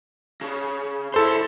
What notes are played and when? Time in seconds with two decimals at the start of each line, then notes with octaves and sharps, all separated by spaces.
0.41 C#3
1.14 D2 E4 A4 C5 C6